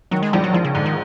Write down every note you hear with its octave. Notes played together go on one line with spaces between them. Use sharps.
D#3 F#3
G#3
A#1 G3
F#3
A#1 F3
C#3
G#2 D3
D#3